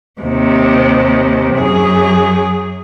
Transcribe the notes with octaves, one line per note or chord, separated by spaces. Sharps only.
D#2 C3
F#2 G#4